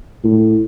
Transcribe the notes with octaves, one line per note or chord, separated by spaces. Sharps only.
A2